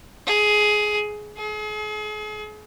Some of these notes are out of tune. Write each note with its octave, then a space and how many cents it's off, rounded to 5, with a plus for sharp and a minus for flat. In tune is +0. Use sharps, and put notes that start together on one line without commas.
G#4 +15
G#4 +40